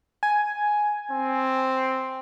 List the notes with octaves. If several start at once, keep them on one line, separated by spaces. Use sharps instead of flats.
G#5
C4